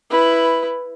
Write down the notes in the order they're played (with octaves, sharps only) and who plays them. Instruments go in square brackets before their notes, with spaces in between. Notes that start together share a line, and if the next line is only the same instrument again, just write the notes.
[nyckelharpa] E4 B4